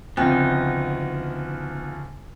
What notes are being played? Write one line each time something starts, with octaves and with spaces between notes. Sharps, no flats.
D2 C#3 F3 B3 C4 D#4 G5